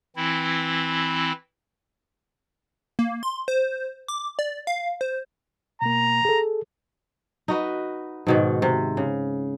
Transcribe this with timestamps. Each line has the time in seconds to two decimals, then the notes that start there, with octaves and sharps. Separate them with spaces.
0.16 E3 C4 E4
2.99 A#3
3.23 C6
3.48 C5
4.08 D6
4.39 D5
4.67 F5
5.01 C5
5.82 B2 A#3 A#5
6.25 G#4 A4
7.48 D#4 F#4 B4
8.27 G#2 B2 D#3
8.62 C3
8.97 C#3